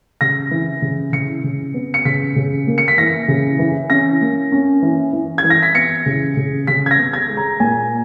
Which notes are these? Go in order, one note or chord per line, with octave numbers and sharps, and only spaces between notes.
C#3 A#6
E3
C#3
C#3 C#7
C#3
B3
C#7
C#3 B6
C#3
A#3
C#7
B6
E3 A#6
C#3
E3
C#4 A#6
A#3
C#4
E3
E3
G#6
E3
A#6
B6
B3 C#7
C#3
C#3
C#3 B6
G#6
A#6
B3
G#6
G#3
A#5
A#2 G#5